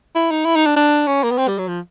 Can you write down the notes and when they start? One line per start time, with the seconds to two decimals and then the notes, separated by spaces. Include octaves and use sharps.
0.15 E4
0.31 D#4
0.45 E4
0.56 D#4
0.66 D4
0.76 D4
1.07 C#4
1.23 A#3
1.31 B3
1.38 C4
1.48 G3
1.59 F#3
1.68 F3